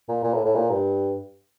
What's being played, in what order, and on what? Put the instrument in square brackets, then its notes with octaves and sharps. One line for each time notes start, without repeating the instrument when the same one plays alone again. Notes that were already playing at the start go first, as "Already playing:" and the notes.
[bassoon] A#2
A#2
A2
A2
A#2
G2